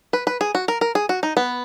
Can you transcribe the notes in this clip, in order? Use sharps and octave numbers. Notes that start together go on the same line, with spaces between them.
B4
B4
G#4
F#4
A#4
A#4
G#4
F#4
D#4
B3